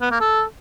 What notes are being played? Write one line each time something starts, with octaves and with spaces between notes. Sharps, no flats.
B3
A#3
A4